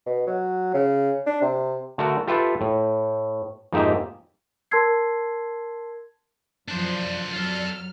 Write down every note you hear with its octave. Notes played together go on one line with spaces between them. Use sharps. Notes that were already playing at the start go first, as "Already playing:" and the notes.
B2
F#3
C#3
D4
C3
D3 A3 F#4 A#4
F4 G4 A4 B4 E5
A2
F2 G#2 A#3 D#4 G4 E5
A#4 A5 C6 E6 G#6 C7
F#2 F3 D4 C5 D5
F#3 F4 A4 F6